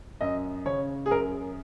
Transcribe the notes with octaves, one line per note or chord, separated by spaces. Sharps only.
F#2 D#5
C#3 C#5
G#4
F#2 A#4